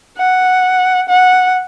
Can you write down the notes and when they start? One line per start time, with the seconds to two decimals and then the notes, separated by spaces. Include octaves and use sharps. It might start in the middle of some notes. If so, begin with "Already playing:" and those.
0.18 F#5
1.09 F#5